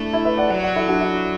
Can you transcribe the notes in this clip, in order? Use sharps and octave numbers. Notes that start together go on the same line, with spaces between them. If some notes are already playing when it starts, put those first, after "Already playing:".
Already playing: A3 D4 E4
E4
B4 E5
D5 F#5
F#3 D5 F#5
D5 F#5
E4 A4
D4 F#4
E4